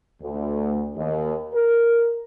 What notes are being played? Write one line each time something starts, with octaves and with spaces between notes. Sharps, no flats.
D2
D#2
A#4